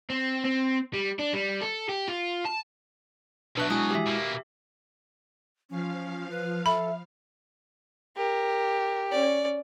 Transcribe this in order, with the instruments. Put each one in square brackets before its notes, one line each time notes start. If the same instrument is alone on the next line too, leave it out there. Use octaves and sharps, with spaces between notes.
[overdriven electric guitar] C4
C4
G3
D4
G3
A4
G4
F4
A5
[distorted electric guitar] B2 F#3 [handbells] D4 F#6 [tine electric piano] B4 E5
[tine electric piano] G#3 E4 F#4 [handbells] G#5 D#6
[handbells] G4 E5
[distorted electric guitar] B2 A#3
[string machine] F3 F5 [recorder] C#4
[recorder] B4
[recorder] A4 [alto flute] E5 [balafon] B5
[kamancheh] G4 [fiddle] A#4
[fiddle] C#4 D5